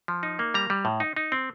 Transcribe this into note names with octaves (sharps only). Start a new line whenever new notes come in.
F3
D#4
A#3
G3 A#5
G3
A2
D#4
D#4
C4